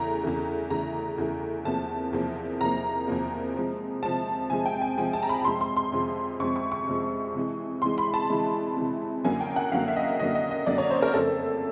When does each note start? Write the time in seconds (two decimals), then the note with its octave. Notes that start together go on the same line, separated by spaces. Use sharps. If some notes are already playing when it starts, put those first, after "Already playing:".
Already playing: E2 C#3 E3 A3 A#5
0.24 E2 C#3 E3 A3
0.70 E2 C#3 E3 A3 A#5
1.18 E2 C#3 E3 A3
1.65 E2 C3 F3 A#3 A5
2.13 E2 C3 F3 A#3
2.61 E2 C3 F3 A#3 A#5
3.08 E2 C3 F3 A#3
3.56 C3 F3 G#3
4.03 C3 F3 G#3 A5
4.50 C3 F3 G#3 G#5
4.66 G5
4.82 G#5
4.97 C3 F3 G#3 G#5
5.13 A5
5.23 A#5
5.29 B5
5.45 F2 C3 F3 G#3 C6
5.61 C6
5.77 C6
5.92 F2 C3 F3 G#3
6.40 F2 C3 F3 G#3 C#6
6.56 C#6
6.72 C#6
6.87 F2 C3 F3 G#3
7.35 C3 E3 G#3
7.82 C3 E3 G#3 C6
7.98 B5
8.14 A5
8.30 C3 E3 G#3
8.77 C3 E3 G#3
9.25 F#2 D3 F#3 A#3 G#5
9.41 G5
9.56 F#5
9.71 F#2 D3 F#3 A#3 F5
9.88 E5
9.96 D#5
10.03 E5
10.20 F#2 D3 F#3 A#3 D#5
10.35 D#5
10.51 D#5
10.66 F#2 D3 F#3 A#3 D5
10.78 C#5
10.91 C5
11.02 A#4
11.14 F2 C#3 F3 A3 A4